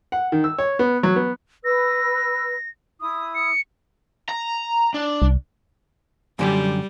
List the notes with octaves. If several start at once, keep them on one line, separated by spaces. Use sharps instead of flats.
F#5
D#3
E6
C#5
B3
F#3
B3
B4 E6 A#6
E4 D#6
C#7
A#5
D4
C2
F#2 D3 G3 G4